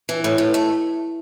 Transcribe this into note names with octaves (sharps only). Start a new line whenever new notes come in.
E3
A2
A2
A3